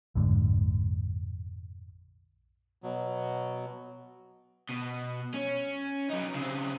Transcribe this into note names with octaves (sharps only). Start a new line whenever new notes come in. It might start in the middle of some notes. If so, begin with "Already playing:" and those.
A#1 F2 G#2 D3
B2 F#3
B2
C#4
F#3 D#4
C#3 C4